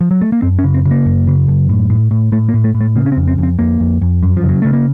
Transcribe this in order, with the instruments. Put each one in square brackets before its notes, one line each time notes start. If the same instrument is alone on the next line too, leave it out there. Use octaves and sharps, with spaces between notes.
[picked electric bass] F3
F#3
A3
A#3
F#2 C4
C#4
C#3
C4
C#3
A#3
F#2
C#3
F#2
A2
A2
A2
A2 A3
A#3
A2
A3
A2
A3
C#3 A#3
C#4
C4
F2
C4
F2 C4
F2 A#3
F2
F2
F#2
F3
C#3 F#3
C#3 A3
A#3